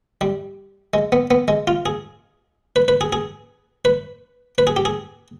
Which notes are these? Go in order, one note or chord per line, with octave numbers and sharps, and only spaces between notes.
G3
G#3
B3
B3
G#3
F4
G#4
B4
B4
G#4
G#4
B4
B4
G#4
G4
G#4